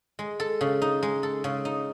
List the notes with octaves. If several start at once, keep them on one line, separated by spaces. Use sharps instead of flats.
G#3
A4
C#3
D#4
G#3
A4
C#3
D#4